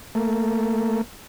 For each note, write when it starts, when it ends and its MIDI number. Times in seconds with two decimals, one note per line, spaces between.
0.15 1.01 57
0.15 1.01 58